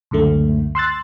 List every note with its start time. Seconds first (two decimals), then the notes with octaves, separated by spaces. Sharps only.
0.11 C#2 F#2 D3 A3
0.75 C6 E6 F#6 A6